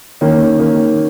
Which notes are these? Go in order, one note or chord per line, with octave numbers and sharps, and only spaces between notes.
D#3 A#3 C#4
D#3 A#3 C#4